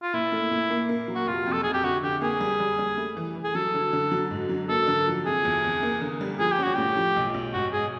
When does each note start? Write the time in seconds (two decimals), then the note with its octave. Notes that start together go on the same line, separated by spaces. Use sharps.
0.02 F4
0.14 A#2 E4
0.32 A3
0.51 A#2
0.70 A#3
0.89 A#3
1.08 F#3
1.15 F#4
1.27 F1 F4
1.46 F2
1.52 A4
1.63 C3 G#4
1.73 G4
1.83 D3 F#4
2.03 D3 G4
2.21 A#3 G#4
2.41 G3
2.60 G3
2.79 G3
2.97 A3
3.17 E3
3.36 E3
3.44 G#4
3.55 F#3 A4
3.75 D3
3.93 D3
4.12 F#3
4.31 G#2
4.49 F#3
4.69 A#3 A4
4.87 D3
5.07 F3
5.26 C3 G#4
5.45 E2
5.64 E2
5.83 A#3
6.01 D3
6.21 G3
6.39 F3 G#4
6.52 G4
6.59 C#4 F#4
6.74 A2 G4
6.97 F3
7.16 B1
7.34 B1
7.53 G#2 F#4
7.72 G#2 G#4